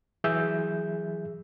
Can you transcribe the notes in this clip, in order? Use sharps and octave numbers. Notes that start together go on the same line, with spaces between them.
E3 F#3 G#4 E5 E6 G6